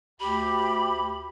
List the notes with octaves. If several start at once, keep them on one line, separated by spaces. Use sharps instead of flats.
D2 G4 B5